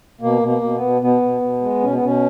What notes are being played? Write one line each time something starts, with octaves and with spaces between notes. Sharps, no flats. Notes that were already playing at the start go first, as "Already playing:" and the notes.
B2 A#3
B2
A#3
B2
B3
B2
B2 B3
B2
B2
G#3
B2 C#4
B3
B2 C#4